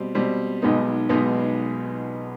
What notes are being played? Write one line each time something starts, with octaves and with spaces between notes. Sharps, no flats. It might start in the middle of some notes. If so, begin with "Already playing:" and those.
Already playing: B2 G3 C4
B2 G3 C4
B1 B2 G#3 B3 D#4
B1 B2 G#3 B3 D#4